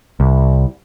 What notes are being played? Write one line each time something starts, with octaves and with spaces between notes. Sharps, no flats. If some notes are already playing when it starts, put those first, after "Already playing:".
C2